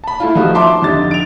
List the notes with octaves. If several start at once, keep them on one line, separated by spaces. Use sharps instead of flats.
A5 B5
A3 E4 F4
D#3 F3 A3 D#4 F#4 G4
E5 A5 C6 D6
F2 D3 D#4 G4 A6
D7 F7